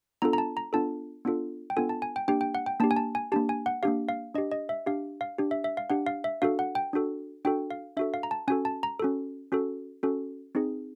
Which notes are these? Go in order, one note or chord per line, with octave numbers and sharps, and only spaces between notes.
B3 D4 F4 A4 A#5
A#5
A5
A#5
B3 D4 F4 A4 A5
B3 D4 F4 A4
G5
B3 D4 F4 A4 G#5
A5
G#5
G5
A#3 D4 G4 G5
G5
F#5
G5
A#3 D4 G4 A5
G#5
A5
G#5
A#3 D4 G4 A5
G#5
F#5
A#3 D4 G4 F5
F5
D4 G4 D#5
D#5
E5
D4 G4 F5
F5
D4 G4
E5
E5
F5
D4 G4 F#5
F5
E5
D4 F#4 A4 F5
F#5
G5
D4 F#4 A4
D4 F#4 A4 G5
F5
D4 F#4 A4 E5
F5
A#5
A5
C#4 F#4 A4 G#5
A5
A#5
C#4 F#4 A4
C#4 F#4 A4
C#4 F#4 A4
C4 D#4 G#4